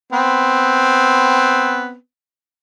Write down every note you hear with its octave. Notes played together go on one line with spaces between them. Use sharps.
B3 C4